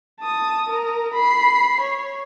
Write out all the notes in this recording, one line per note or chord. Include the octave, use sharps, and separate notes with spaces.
A5 D#6
A#4
B5 C7
C#5